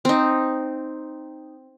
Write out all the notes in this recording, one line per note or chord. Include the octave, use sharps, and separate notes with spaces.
C4 D#4